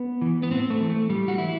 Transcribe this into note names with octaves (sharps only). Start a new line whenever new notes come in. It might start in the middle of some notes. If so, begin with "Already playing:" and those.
Already playing: B3
E3
B3
A2 C4
A3
E3
A3
A2 G3
F#4
E3 E4